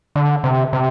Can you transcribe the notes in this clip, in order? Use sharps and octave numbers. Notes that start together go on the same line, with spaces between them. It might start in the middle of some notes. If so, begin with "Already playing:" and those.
D3
C3
C3